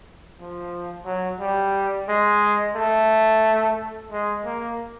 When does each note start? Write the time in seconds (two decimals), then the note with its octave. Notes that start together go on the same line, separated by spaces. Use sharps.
0.39 F3
1.05 F#3
1.40 G3
2.09 G#3
2.76 A3
4.12 G#3
4.45 A#3